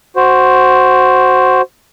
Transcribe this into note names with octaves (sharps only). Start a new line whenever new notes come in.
F#4 C5